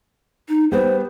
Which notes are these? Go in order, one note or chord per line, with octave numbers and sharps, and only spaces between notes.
D#4
G3 B3 C5